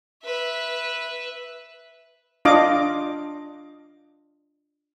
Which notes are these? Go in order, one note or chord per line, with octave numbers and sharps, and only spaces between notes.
B4 E5
D4 F4 D#5 F5 D6